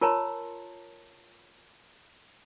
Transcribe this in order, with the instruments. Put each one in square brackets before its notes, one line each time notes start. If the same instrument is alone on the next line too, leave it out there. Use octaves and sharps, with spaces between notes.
[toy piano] F4 A#4 C#5 A5 A#5 C6